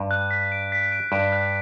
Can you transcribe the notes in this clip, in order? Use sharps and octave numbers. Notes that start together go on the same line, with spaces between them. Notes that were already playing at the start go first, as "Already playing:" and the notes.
Already playing: G2
F#6
B6
D7
B6
D7
G2 D7
F#6